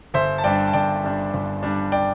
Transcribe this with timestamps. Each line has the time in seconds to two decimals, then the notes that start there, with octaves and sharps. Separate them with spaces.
0.14 G1 C5 E5
0.38 A5
0.44 G2 G3 D4 D5 G5
0.67 A5
0.73 G1 D5 G5
1.03 G2 G3 D4
1.33 G1
1.63 G2 G3 D4
1.92 D5 G5